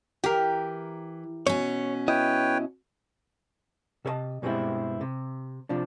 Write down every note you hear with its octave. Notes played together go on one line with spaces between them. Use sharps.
E3 G4 A#4
B2 C#4 C#5
E4 B4 C#5 D#5 G5
C3 A4 C#5 D#5 A5
G2 B2 G3 G#3 C4 E4
C3
C3 F3 D4